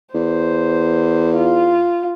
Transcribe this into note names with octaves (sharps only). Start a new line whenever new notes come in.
E2 C5
F4